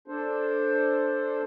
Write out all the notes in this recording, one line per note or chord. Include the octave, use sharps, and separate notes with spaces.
D4 A4 C5